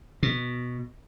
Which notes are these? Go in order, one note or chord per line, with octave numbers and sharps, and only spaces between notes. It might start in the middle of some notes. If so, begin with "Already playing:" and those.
B2